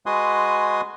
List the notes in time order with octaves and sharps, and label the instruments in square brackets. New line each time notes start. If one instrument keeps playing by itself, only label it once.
[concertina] G#3 F#4 B4 G#5 C6 D#6